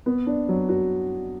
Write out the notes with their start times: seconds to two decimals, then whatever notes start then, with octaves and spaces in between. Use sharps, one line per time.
0.06 B3
0.27 D4
0.48 F#3
0.69 F#4